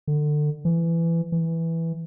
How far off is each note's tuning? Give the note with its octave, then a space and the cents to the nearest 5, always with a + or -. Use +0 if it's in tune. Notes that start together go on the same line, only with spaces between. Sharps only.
D3 +25
E3 +20
E3 +0